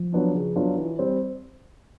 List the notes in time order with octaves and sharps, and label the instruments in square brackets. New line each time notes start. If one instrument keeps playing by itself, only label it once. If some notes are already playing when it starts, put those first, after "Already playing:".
Already playing: [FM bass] F3
[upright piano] F#3 B3 D4 F4
C#3
F#3 B3 D4 F4
E3
G3 C4